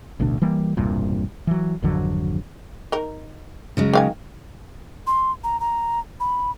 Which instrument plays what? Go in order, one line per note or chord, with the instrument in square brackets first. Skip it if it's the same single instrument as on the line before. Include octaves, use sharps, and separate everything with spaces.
[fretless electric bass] A1 D2 B2 D4
E3 G3 A#3
E1 C2 G2 A#2
E3 F#3
G#1 F2 D3 F#3
[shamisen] D#4 A#4
[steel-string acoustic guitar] C#3 F#3 G#3
[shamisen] D#3 F5 G#5
[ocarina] C6
A#5
A#5
B5